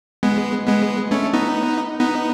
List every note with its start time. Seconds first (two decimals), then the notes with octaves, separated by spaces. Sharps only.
0.23 G#3 B3
0.67 G#3 B3
1.11 A3 C#4
1.33 B3 D#4
2.00 B3 D#4